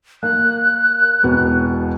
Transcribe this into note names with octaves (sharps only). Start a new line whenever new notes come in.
A#3 F#6
E1 B2 B3